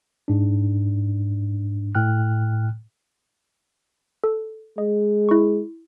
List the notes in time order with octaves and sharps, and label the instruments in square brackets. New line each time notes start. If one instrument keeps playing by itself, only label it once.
[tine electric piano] G#2 D4
A2 G5 F6 F#6
[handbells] A4
[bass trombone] G#3 [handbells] D#5
[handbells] E4 C#6